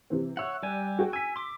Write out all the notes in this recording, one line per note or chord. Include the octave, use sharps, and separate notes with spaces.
C3 E3 C4
C#5 E5 F#5 E6 F#6
G3 G4 D5 G#5
F#4 G#4 G5
G#5 E6 B6
C6 D6